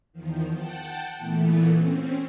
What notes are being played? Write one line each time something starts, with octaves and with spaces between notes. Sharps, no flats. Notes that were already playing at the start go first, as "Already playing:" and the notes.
E2 D#3 F3
F#5 G5 A5
A#2 E3 A3 B3
C4 C#4